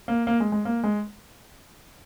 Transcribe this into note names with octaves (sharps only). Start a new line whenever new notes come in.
A#3
A#3
G#3
G#3
A#3
G#3